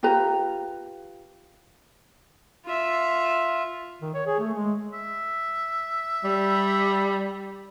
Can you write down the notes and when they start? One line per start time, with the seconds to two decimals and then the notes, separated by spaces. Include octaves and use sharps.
0.03 F4 G4 B4 A#5
2.66 F4 E5
4.01 D#3
4.14 C#5
4.27 G#4
4.40 A3
4.54 G#3
4.93 E5
6.24 G3